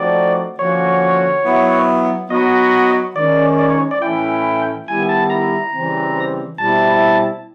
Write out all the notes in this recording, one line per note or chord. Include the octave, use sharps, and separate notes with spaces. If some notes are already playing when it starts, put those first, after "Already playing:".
Already playing: F3 A3 C4 D#4 F#4 D5
D3 F3 A#3 C#4 F#4 C#5
F#3 B3 E4
F#3 B3 D#4 F#4 D#5
D#3 G#3 C#4 D5
D5
C#5
D5
A2 E3 A3 C#4 E4 G5
D#3 G3 B3 E4 G#5
A5
A#5
C#3 E3 G3 C4
B2 G3 C4 E4 A5